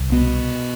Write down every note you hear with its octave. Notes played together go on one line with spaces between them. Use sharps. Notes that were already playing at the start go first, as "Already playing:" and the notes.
Already playing: C2
B2 B3